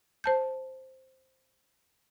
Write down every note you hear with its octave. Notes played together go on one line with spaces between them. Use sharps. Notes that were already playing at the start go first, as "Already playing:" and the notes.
C5 A5 G6